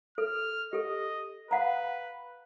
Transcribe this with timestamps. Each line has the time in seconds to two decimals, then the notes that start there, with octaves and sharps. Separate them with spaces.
0.18 A4 F6
0.73 G4 A4 D#5
1.51 B4 F5 F#5 A#5